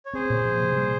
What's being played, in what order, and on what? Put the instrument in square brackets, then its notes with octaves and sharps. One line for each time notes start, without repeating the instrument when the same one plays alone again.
[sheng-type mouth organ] C#5
[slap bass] C4 [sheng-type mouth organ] G#4 C5
[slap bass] A#2
F3
C3
G3